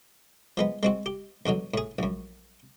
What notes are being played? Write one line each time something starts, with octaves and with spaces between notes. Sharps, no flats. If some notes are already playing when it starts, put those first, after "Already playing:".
F3 G#3 B3
G#3 C4 F#4
G4
E2 B2 D3 F#3
A2 G#4
A#1 F#2